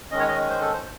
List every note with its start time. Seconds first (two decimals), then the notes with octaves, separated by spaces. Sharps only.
0.11 D#3 G#3 C#4 D#5
0.20 C#5
0.28 D#5
0.49 C5
0.61 A4
0.73 C5